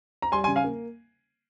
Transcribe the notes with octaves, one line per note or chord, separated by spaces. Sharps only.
A#5
G3 G#5 C6
G#5 C6
C#3
F5 G#5
A#3